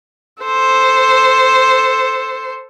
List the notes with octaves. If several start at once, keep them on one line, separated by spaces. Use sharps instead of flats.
A4 C5